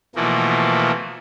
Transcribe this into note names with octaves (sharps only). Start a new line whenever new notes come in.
B2 E3 F3 A3 A#3